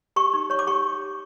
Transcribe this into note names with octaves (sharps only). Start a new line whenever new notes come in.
G4 C#6
D#4
C#5 C#6
D6
G4 C#6